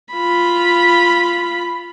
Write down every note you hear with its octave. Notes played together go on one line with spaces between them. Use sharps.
F4 B5